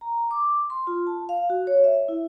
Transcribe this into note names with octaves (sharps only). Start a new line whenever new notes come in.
A#5
D6
C6
F4
A5
F5
F#4
C#5
E5
E4